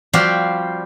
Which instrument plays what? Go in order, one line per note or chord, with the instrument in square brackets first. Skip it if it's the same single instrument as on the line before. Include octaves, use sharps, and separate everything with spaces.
[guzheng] F3 G3 C4 F#4 D5 F5